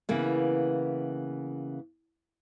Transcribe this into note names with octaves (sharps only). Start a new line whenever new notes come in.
C#3 E3 A#3 B3